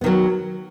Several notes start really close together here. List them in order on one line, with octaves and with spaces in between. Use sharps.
B3 D#3 F#3